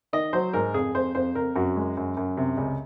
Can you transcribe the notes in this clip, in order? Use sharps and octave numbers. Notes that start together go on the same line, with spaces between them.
D#3 D#5
F#3 C5
G#2 A#4
F2 G#4
F2 C5
F2 C5
F2 A#4
F#2 F#4
G#3
F#2
F#2
C3
C#2